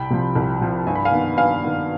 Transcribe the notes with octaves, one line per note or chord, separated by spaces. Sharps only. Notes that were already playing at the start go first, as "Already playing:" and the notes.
Already playing: C2 G5 B5
C3 F3
C2
C3 F3
G2 G#5
B5
F5 G#5
D#3 B3
G2 F5 G#5
D#3 B3